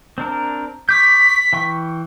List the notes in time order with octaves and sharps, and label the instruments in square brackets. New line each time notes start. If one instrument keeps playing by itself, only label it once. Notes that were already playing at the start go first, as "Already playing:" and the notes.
[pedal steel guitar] C4 D4 A#4
[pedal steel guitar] C#6 D6 G6 [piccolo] B6
[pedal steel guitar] E3 G5 C#6